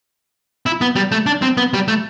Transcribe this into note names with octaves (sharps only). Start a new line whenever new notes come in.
E4
B3
G3
A3
D4
C4
B3
G3
A3